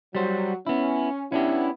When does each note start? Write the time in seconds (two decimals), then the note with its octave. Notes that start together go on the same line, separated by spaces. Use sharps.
0.15 F#3 G3 C5
0.67 B3 C#4 E4
1.32 B3 C#4 D4 E4 G4